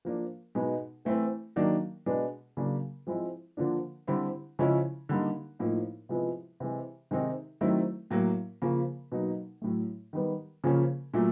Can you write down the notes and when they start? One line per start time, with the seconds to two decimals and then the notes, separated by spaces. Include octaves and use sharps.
0.05 F3 A#3 D4
0.55 B2 G#3 B3 D#4
1.05 E3 A3 C4 E4
1.56 D#3 F#3 A#3 D4
2.06 B2 G#3 B3 D4
2.57 C#3 F#3 A#3 D4
3.07 F3 G#3 C4 E4
3.57 D3 F3 A#3 D4
4.08 D3 G3 C4 E4
4.59 C#3 F3 G#3 C#4 E4
5.09 D3 G3 A#3 D#4
5.59 A2 F3 A#3 D#4
6.09 C3 F3 G#3 B3 E4
6.60 C3 E3 G#3
7.11 C3 D#3 G#3 C4 D#4
7.61 D#3 F#3 A3 C4 E4
8.10 A2 F#3 A#3
8.62 C#3 F3 A#3
9.12 B2 F#3 A#3 D#4
9.62 A2 F#3 A3
10.13 D#3 G3 B3
10.64 C#3 F3 A#3 C#4
11.13 A#2 F#3 A3